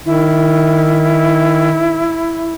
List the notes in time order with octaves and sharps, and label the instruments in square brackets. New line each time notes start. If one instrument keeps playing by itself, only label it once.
[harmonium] D#3 [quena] E4